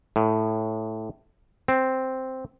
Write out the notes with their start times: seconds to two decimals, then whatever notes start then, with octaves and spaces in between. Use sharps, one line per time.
0.16 A2
1.68 C4